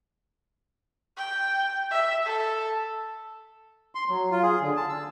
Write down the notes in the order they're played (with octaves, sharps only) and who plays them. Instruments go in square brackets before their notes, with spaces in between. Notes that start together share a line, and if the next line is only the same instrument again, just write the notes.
[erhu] G5
E5
A4
[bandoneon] C6
F#3
F4
G#4
D3
A5
E6